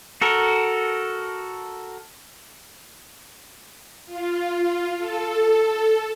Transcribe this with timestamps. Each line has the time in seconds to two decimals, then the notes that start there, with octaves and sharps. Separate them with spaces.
0.21 F#4 A4 A#4
4.06 F4
4.98 A4